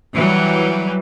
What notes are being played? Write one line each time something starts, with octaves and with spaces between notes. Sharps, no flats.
E3 F#3 G3